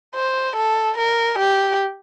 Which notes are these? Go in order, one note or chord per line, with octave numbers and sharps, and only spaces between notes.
C5
A4
A#4
G4